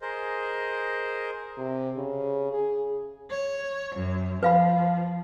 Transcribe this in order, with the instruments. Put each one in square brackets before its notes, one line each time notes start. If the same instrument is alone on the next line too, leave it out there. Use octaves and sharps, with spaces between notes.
[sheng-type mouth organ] G#4 A#4 C5 D#5
[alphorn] C3
C#3
G#4
[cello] C#5
F#2
[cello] F3 [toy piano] B4 F5 B5